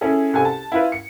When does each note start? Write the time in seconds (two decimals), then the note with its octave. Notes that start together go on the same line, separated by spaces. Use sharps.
0.01 C#4 E4 G#4 A4
0.34 C2 A4 G#5
0.45 A5
0.72 E4 F4 B4
0.92 C#7